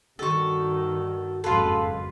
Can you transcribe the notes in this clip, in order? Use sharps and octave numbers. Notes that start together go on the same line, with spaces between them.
G2 D#3 F#4 A4 C#6
F#1 F2 G#2 F4 F#4 A4 B4